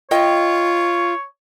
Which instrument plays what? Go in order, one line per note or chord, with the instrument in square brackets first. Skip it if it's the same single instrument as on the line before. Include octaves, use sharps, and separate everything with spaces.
[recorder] F4 [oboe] C#5 [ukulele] D#5 G5